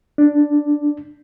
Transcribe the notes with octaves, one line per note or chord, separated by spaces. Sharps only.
D4